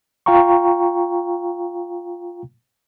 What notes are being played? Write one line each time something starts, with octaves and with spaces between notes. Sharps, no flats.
F4 F5 G5 A#5 C#6